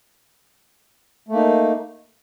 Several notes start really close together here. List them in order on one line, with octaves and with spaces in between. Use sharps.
A3 A#3 D#4